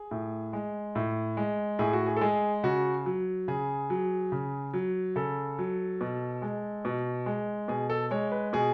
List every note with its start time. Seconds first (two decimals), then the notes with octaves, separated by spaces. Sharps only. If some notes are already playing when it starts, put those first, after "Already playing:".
Already playing: G#4
0.11 A2
0.53 G#3
0.95 A2
1.37 G#3
1.79 A2 G#4
1.93 F#4
2.06 G#4
2.17 A4
2.21 G#3 G#4
2.64 C#3 F#4
3.06 F#3
3.48 C#3 G#4
3.90 F#3
4.32 C#3
4.74 F#3
5.16 C#3 A4
5.59 F#3
6.01 B2
6.42 G#3
6.85 B2
7.26 G#3
7.68 B2 G#4
7.90 A4
8.11 G#3 C#5
8.32 B4
8.53 B2 G#4